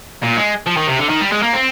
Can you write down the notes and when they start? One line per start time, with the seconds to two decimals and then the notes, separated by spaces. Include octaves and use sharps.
0.23 A#2
0.37 G#3
0.66 F3
0.77 D#3
0.87 C3
0.99 D3
1.09 D#3
1.21 G3
1.32 G#3
1.42 A#3
1.53 C4